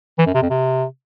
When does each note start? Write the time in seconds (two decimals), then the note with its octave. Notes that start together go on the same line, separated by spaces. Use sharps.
0.19 E3
0.26 F#2
0.34 C3
0.42 F2
0.50 C3